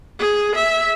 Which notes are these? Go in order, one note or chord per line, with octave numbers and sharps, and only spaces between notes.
G#4
E5